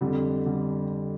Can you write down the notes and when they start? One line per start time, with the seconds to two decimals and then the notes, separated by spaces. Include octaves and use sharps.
0.01 F2 D3 G3
0.46 D3 G3